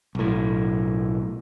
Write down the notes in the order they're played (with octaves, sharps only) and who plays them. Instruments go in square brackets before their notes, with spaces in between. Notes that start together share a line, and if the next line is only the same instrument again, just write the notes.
[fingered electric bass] B1 A2